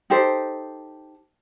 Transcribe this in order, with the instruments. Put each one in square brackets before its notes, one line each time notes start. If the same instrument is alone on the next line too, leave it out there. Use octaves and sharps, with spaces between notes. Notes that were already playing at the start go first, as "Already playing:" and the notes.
[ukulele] D#4 G4 A4 C5